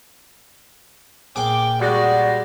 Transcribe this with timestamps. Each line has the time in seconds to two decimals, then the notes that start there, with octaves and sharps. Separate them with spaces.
1.36 A#1 G#4 G5 D6
1.81 G3 G#3 F#4 D5